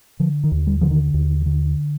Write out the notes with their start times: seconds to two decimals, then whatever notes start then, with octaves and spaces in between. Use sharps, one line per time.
0.20 D3 F3
0.44 D#3
0.52 D#2
0.67 G3
0.81 D3 F3
0.91 D#3
1.14 D#2
1.46 D3